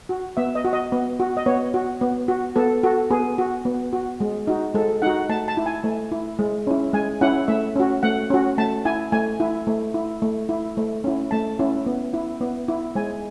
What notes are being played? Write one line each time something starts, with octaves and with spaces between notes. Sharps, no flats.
F#4
B3 E5
D#5
F#4
D#5
B3
F#4
D#5
B3 C#5
F#4
B3
F#4
B3 A4
F#4 A4
B3 G#4
F#4
B3
F#4
G#3
D#4 F#4
G#3 A4
D#4 F#4 F#5
A3 A5
A5
E4
G#5
A3
E4
G#3
C#4 E4
G#3 G#5
C#4 E4 F#5
A3 E5
C#4 F#4
A3 F#5
C#4 F#4
A3 A5
E4 G#5
A3 G#5
E4
A3
E4
A3
E4
A3
C#4 E4
A3 A5
C#4 E4
B3
E4
B3
E4
G#3 G#5